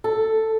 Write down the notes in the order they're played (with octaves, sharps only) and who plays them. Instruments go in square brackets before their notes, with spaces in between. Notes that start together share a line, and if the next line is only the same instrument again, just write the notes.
[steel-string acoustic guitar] A4